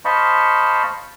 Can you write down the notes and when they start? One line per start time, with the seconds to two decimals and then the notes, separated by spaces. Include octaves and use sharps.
0.05 C5 D#5 F5 A5 B5 C#6